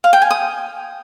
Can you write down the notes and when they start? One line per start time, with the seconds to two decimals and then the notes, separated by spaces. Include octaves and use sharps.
0.04 F5
0.13 G5
0.22 G#5
0.31 D#6